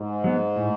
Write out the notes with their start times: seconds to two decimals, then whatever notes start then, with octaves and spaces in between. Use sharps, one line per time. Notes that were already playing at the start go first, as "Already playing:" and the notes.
Already playing: G#2
0.24 F#3 B3
0.56 A2